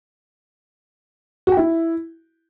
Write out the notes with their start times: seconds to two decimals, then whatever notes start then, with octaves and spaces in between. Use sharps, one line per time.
1.47 F#4
1.52 G5
1.57 E4